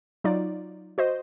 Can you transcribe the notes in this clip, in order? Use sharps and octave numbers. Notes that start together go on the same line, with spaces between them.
F#3 D#4 F4 D5
F#4 C5 D#5